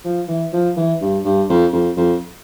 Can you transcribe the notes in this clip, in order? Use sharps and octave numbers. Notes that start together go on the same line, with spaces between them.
F3
E3
F3
E3
G2
G2
F2
F2
F2